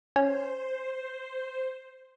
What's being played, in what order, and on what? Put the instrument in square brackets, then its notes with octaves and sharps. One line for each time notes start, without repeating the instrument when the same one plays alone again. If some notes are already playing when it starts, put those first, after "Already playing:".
[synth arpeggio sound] C#4 C#5 [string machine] C5